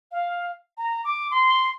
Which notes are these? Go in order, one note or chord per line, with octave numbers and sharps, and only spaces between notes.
F5
A#5
D6
C6